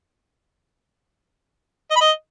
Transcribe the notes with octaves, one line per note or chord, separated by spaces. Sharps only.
D#5
B5
D#5